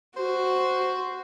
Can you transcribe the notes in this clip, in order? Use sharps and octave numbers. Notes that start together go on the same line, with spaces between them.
F#4 C5